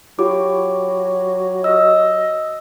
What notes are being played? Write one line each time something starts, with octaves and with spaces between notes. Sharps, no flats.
F#3 F4 G4 D6
D#5 E6 F6